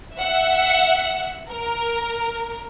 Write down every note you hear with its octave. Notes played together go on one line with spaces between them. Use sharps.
E5 F#5
A#4